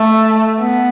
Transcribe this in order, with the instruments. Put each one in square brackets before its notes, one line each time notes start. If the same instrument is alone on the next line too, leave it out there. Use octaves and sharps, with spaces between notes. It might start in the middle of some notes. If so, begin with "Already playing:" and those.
Already playing: [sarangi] A3
B3